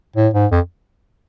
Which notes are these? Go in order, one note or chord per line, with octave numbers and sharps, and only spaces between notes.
A2
G#2
F2